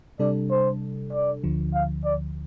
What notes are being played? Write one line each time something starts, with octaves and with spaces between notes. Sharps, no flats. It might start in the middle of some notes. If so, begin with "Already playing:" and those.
C3 G3 D4 A4 D5
C5
D5
D2 D3 F3
F5
D5